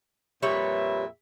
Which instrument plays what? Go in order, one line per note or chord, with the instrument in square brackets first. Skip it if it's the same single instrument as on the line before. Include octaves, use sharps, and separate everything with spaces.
[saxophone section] F2 A#2 E5 [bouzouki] G3 B4 C#5